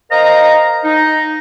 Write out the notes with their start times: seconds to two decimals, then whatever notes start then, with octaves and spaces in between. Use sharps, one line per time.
0.11 A#4 C5 D#5 F5 A#5
0.84 D#4